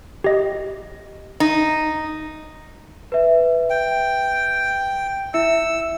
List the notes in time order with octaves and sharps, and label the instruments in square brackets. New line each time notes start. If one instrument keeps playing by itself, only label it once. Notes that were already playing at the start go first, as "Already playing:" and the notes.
[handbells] G4 D#5
[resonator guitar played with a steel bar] D#4
[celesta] B4 E5
[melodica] G5
[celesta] E4 E5 C#7 [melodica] E6